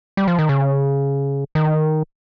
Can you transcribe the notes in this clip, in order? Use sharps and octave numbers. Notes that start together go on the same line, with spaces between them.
G3
F3
D#3
C#3
D#3